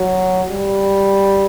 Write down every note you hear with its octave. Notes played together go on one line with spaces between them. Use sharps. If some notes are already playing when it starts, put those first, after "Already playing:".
Already playing: F#3
G3